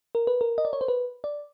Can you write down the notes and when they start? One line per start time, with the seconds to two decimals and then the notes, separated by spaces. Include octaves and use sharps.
0.15 A#4
0.27 B4
0.41 A#4
0.58 D#5
0.65 D5
0.73 C#5
0.81 C5
0.88 B4
1.24 D5